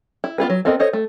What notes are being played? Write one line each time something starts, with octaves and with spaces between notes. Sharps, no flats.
E4
B3 F4 G#4 B4
F#3
B3 C4 A4 A#4 D#5
A4 C5 C#5 D#5
A3